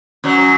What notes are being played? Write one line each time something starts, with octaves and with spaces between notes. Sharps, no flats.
F#2 F#3